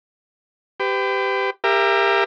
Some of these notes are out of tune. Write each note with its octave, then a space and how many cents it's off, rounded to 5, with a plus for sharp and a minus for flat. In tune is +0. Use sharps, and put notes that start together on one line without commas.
G4 +0 B4 +40
G4 +25 A#4 +0 E5 +25